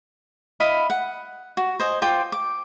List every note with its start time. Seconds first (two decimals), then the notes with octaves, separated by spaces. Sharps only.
0.60 E4 D#5 F5 B5
0.90 F#5
1.57 F#4
1.80 C5 D#5 G#5
2.02 F4 C5 G5 D6
2.32 D6